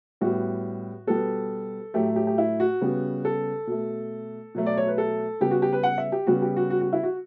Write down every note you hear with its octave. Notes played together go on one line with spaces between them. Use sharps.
A2 G3 B3 F#4
B2 G3 B3 A4
A2 F#3 A3 G4
G4
G4
E4
F#4
C#3 G3 B3
A4
B2 A3
B2 F#3 A3
D5
C#5
B4
A4
C#3 G3 B3 G4
F#4
G4
B4
F#5
E5
G4
C#3 G3 B3 F#4
G4
F#4
F#4
F#4
E4
F#4